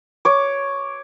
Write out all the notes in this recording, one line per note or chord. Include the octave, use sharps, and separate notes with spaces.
C#5 D6